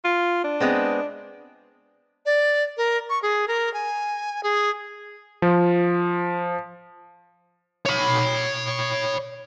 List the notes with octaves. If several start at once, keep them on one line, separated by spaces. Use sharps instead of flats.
F4
D4
G#3 B3 C4
D5
A#4
C#6
G#4
A#4
G#5
G#4
F3
C#5 B5